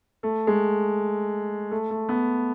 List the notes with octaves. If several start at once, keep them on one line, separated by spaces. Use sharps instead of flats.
A3
G#3
A3
A3
B3